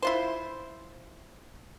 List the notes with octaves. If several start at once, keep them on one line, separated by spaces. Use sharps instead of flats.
E4 F4 C5